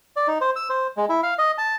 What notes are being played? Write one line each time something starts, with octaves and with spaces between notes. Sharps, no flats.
D5
D#4
C5
E6
C5
G#3
E4
F5
D#5
A5